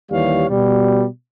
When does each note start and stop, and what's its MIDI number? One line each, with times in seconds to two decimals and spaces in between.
0.11 0.45 39
0.11 0.45 52
0.11 0.45 55
0.11 0.45 73
0.11 0.45 77
0.49 1.05 47
0.49 1.05 55